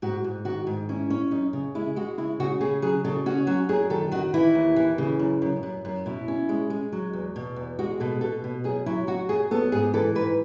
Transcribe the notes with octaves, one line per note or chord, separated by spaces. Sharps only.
G#2 F#4
G#2
D#3 F#4
G#2
C#4 E4
C#4
F#2 D#4
C#3
G#3 E4
G#3 F#4
C#3 E4
C#3 F#4
C#3 G#4
F#3 G#4
C#3 A4
C#4 F#4
F#3 F#4
F#2 G#4
D#3 A4
D#3 F#4
E3 E4
D#2
E3
C#3
F#2
F#2
F#2
F#2
B2 E4
C#4
G#3
G#3
F#3
E2
B2
E2
G#3 F#4
B2 A4
B2 A4
B2
F#2 G#4
F#3 E4
F#3 F#4
F#2 G#4
B3 A4
G#2 G#4
E3 A4
G#2 B4